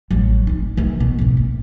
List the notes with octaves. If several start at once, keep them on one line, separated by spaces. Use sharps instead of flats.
A1 F#3
D4 D#4
D#3 E3
B2
G#1 D3
A#1